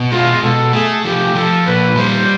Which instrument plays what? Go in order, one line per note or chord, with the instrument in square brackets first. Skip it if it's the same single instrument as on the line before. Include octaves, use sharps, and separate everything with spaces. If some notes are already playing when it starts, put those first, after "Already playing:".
Already playing: [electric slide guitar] B2
[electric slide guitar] G#3 [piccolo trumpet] F4
[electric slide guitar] B2 [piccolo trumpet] A4
[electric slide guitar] A3 [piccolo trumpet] G#4
[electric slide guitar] F3 [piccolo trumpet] G4
[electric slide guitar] F3 [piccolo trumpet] A4
[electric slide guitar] A#2 [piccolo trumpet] B4
[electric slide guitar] G3 [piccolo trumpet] C5